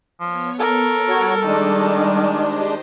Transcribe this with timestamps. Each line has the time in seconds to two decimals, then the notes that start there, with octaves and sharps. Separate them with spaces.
0.20 F3 B3 C#5
0.60 A4 A#4
1.08 G3 F#4 C#5
1.46 D#3 G#3 D4
2.28 G4 C5 D#5